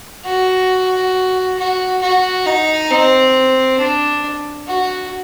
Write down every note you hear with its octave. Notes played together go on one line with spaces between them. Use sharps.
F#4
F#4
F#4
D#4
C4
D4
F#4